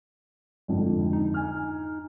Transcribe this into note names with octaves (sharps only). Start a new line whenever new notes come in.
G#1 F2 D3
D#4
G#5 F6